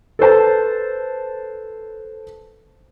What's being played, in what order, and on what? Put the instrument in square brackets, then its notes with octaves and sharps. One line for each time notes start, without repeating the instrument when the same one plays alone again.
[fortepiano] A4 B4 C5 A5